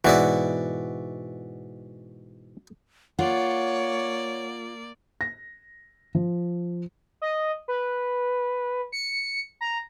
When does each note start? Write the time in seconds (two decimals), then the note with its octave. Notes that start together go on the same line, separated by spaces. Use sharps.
0.04 G#2 B2 E3 F#4 D5 E5
3.19 A#3 F4 C#5 D5 F#5
5.21 A#6
6.15 F3
7.22 D#5
7.68 B4
8.92 C#7
9.61 A#5